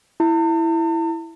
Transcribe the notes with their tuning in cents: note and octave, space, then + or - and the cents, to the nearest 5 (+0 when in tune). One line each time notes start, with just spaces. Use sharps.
E4 +0 A5 +45